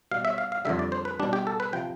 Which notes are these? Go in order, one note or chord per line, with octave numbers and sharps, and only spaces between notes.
B2 G3 F5
E5
F5
F5
F2 D3 G3 E5
D5
C5
B4
B2 G3 D4
G4
A4
B4
C3 F3 G5